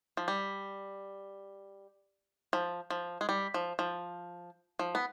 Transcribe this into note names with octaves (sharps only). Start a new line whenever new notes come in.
F3
G3
F3
F3
G#3
G3
F3
F3
F3
B3